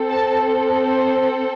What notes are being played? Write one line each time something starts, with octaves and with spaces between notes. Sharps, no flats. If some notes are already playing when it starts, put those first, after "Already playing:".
Already playing: C4 A4
A5
C5